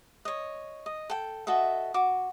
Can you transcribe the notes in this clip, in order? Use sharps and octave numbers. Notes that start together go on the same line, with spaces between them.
C#5 D#5
D#5
A4 G5
F#4 A4 D#5 E5
F#4 D6